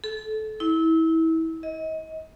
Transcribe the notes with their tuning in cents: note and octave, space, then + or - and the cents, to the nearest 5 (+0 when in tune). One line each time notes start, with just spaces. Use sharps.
A4 -25
E4 -25
D#5 +30